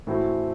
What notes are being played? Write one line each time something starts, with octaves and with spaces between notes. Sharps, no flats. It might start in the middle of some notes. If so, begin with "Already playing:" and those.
A2 E3 A3 C4 F#4